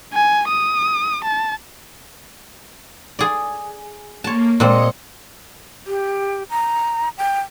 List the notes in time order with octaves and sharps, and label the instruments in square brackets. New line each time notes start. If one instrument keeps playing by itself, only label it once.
[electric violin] G#5
D#6
A5
[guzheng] G#4 D5
[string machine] A#3 [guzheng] C#5 A5
[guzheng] A#2 C4 [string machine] G#3 D#5 C#7
[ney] G4
A#5
G5